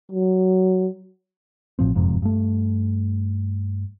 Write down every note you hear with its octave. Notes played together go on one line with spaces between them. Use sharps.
F#3
A1 A2 F3 C4
F#1 F2 G#2 C3
G2 A3